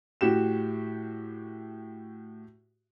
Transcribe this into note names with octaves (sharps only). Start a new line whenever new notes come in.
A2 F#4 G4 E7